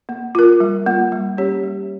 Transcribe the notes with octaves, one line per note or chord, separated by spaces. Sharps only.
A#3
F4 A#4
G3
A#3 F4
G3
A#3 C#4 G4 C#5
G3